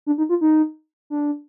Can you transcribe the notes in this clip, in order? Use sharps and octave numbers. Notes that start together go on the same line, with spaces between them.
D4
D#4
F4
D#4
D4